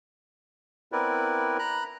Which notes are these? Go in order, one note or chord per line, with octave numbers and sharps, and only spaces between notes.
B3 C4 E4 A#4 B4 D5
A#5 B5 F#6